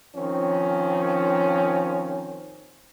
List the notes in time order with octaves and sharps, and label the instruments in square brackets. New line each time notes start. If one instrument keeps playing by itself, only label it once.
[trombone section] D#3 F3 C4 C#4